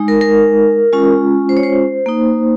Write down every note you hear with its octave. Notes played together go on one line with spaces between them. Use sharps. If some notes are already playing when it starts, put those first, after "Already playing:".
Already playing: G#3 D#4
A#4
A#4
G#3 C#4 F4
C5
C#5
C5
A#3 D#4